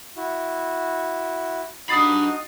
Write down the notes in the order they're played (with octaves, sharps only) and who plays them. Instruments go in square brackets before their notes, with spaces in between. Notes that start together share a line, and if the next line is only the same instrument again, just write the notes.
[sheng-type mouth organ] E4 F#4
[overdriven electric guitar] D4 B5 [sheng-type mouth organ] D#4 F#4 D#5 [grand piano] D#6 A6 C7